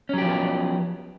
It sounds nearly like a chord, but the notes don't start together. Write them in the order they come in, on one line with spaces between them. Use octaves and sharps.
C#4 F#3 G4 F3 B3